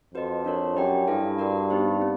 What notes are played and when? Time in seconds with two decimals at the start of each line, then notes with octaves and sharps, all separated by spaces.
0.14 F2 F#4 B4 D#5
0.45 D4 F4 A#4 C#5
0.76 F#2 G4 A#4 D5 G5
1.07 G2 E4 A4 D5 F5 G#5
1.38 F#4 A#4 D5
1.70 B3 D#4 G4 C5
2.02 C4